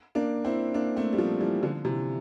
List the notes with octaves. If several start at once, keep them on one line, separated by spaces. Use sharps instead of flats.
A#3 D4
C4 E4
A#3 D4
A3 C4
G3
F3 A3
E3 G3
D3 F3
C3 E3